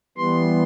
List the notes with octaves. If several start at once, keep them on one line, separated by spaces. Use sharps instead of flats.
E3 G3 B3 C6